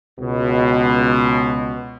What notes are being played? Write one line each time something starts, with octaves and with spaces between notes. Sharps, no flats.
C#2 B2